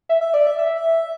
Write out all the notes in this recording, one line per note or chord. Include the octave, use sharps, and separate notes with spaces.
E5
E5
D5
E5
E5